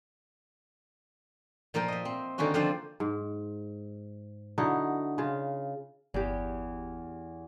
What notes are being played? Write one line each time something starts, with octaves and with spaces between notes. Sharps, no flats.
A#2 F3 A#3 A#4 G5
D#5 E5
C4
D3 D#3 A#3 C#4 F#4
D3 F3 C4 D5 F5 G5
G#2
D3 D#4 E4 F#4
C#3 F4
G1 E2 G4